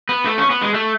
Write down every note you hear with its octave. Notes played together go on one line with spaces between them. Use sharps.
B3
A3
C#4
B3
G#3
A3